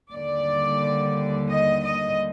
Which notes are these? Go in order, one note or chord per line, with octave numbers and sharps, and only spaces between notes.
D#2 D3 G3 D5
D#5
D#5